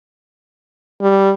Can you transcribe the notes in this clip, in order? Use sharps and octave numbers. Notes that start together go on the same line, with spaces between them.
G3